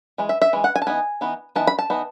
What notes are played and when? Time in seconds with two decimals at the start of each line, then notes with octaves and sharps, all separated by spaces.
0.18 E3 G#3
0.29 E5
0.42 E5
0.53 E3 G#3
0.64 F#5
0.76 G#5
0.82 A5
0.87 E3 B3 D#4 G#5
1.21 E3 B3 D#4
1.56 E3 B3 D#4 A5
1.67 B5
1.79 A5
1.90 E3 B3 D#4